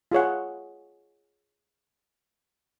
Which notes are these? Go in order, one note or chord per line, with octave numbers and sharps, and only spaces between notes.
F4 G#4 C#5 F#5